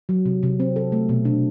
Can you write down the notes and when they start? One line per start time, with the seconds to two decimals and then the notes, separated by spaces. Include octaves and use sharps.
0.09 F#3
0.26 C3
0.43 C3
0.60 C4
0.76 A4
0.92 A3
1.09 B2
1.25 D4